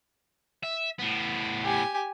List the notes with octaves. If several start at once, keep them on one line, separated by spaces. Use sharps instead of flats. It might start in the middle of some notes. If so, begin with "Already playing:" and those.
E5
A2 B3
G4 G#5